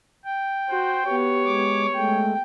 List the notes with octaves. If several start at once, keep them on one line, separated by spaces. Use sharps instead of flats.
G5
F#4 C5
B3 G4 C#5
G#3 D6
G#3 A3 G5